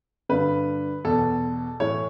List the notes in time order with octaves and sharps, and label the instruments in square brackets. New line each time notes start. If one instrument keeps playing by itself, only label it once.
[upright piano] G2 D3 B4
E2 B2 A4
A2 E3 C#5